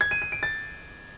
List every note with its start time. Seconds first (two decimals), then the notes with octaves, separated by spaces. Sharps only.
0.01 G#6
0.11 D#7
0.22 D#7
0.32 D7
0.43 A6